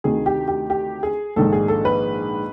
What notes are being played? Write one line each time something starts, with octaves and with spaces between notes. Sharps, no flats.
D2 C3 D#3 G#4
G4
G4
G4
G#4
A#1 G#2 D#3 G#3 A4
G#4
A4
B4